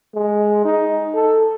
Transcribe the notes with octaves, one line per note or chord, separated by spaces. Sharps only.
G#3
D#4
A4